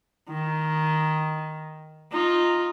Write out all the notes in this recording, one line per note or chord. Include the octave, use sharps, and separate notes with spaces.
D#3
D#4 F4